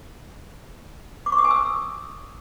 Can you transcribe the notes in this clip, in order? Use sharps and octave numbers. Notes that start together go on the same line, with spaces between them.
D6
C#6
D#6
G#5
E6